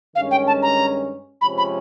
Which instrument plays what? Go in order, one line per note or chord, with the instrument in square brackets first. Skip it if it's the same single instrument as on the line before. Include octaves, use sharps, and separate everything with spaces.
[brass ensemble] G2 D#3 G#3 C#4 [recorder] F5
[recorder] G5
A5
A#5
[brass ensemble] C3 F3 G#3 C#4 [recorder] B5
[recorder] B5